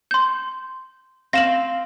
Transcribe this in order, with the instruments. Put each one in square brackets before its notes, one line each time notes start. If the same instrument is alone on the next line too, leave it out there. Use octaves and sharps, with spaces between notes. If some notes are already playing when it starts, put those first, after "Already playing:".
[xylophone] C6 G6
[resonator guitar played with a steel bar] C4 F5 [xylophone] A#6 E7 F#7